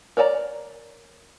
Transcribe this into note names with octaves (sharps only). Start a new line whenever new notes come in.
A#4 C#5 D5 A5 A#5